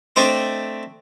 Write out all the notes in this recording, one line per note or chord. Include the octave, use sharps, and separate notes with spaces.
A3 C4 D4 C5 D#5